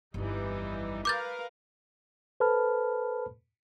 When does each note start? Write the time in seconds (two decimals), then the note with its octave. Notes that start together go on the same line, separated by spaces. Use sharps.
0.14 G1 F2 E3 G3 D#4
1.05 A#4 B4 F5 D6 G6 A6
2.40 A4 B4 C5 A5 B5 F6